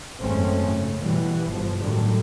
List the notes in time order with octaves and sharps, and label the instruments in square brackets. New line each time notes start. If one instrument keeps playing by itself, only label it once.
[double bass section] G#1 F#2 G#3 A3 C4 C#4
C#3
B2 E3 G3
G1 F3
A2 D3 D#3 F#3 G3 A3